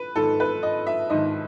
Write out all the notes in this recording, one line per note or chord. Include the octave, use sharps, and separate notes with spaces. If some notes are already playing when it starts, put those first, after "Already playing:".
Already playing: B4
G#2 D#3 A4
B4
D#5
E5
G#2 D#3 D#5